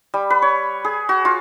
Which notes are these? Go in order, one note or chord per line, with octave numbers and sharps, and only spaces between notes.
G3
B4
C#5
G#4
F#4
F4